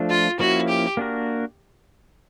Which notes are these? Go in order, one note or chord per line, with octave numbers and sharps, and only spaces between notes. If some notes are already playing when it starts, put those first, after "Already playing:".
Already playing: F3 A3 D4
F4
F3 A#3 C#4 E4 F#4
G4
A#3 D4 F#4 A#4